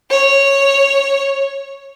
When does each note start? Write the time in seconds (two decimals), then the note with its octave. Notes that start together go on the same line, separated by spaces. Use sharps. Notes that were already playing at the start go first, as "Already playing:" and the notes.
0.10 C#5